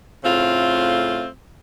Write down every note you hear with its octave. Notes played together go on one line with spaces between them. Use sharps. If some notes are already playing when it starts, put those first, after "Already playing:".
A2 C#3 A3 C4 F4